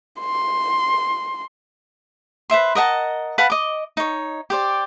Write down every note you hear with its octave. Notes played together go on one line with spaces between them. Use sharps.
C6
B4 C5 E5 C6
A#4 D#5 F#5 A5
B4 F5 F#5 A5
D#5 D6
D#4 C#5
G4 C5 D5